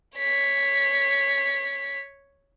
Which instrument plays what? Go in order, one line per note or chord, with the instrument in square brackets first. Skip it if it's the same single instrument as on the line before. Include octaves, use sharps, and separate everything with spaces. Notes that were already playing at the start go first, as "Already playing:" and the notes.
[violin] C#5 B6